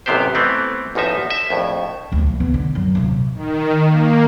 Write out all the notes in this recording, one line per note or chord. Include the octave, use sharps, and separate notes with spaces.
A1 F#2 C3 B3 G4 C5
E3 A3 B3 C4
A1 E2 F3 D#4 E5
E5
A#1 F2 A2
D2 G3
F3
F1 B3
D3
F#2 F#3
D#1 C3
D#3
A#3